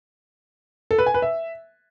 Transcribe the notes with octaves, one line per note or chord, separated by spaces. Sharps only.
A4
B4
G#5
B4
E5